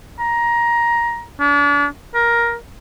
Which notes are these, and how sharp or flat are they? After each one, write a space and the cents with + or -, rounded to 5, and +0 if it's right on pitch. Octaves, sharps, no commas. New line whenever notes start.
A#5 +15
D4 -40
A#4 +10